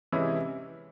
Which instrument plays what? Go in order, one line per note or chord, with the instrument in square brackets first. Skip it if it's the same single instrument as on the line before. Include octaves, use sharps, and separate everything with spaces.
[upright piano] C3 E3 G#3 C#4 E4